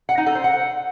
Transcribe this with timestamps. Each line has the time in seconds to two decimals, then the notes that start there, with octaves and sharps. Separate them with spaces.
0.09 F#5
0.18 D#4
0.26 A4
0.35 C5
0.44 F#5